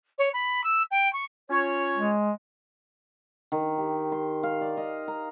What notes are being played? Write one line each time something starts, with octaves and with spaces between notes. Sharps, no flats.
C#5
B5
E6
G5
C#6
C#4 F4 C#5
G#3
D#3
G4
C6
F5
D5
D#5
A#5